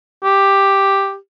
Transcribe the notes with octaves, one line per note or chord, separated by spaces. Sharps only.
G4